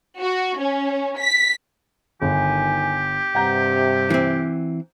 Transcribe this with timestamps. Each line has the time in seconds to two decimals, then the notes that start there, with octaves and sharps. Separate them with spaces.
0.19 F#4
0.59 C#4
1.18 B6
2.22 G1 D#3 G4 G#5
3.35 G2 C3 F#5 A#5 G6
4.10 E3 C4